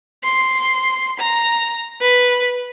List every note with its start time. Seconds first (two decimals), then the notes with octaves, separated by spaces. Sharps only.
0.24 C6
1.19 A#5
2.01 B4